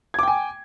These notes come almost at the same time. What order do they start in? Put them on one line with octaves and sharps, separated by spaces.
G#6 D6 G5 G#5